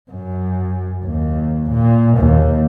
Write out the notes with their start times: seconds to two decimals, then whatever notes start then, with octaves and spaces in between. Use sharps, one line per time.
0.11 F#2
1.05 D#2
1.70 A#2
2.18 D#2